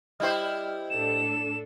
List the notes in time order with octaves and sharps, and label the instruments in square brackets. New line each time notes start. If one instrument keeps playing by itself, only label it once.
[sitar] G3 E4 C5 [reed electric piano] D#5 G5 [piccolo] F6
[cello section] A2 D4 A4 [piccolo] E7